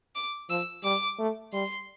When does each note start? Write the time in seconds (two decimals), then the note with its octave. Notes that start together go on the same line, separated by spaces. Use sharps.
0.15 D6
0.50 F3 E6
0.84 G3 D6
1.19 A3
1.53 G3 C6